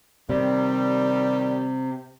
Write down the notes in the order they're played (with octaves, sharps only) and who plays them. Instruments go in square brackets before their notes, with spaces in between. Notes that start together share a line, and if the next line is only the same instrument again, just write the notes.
[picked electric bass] C3 [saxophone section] D#3 G3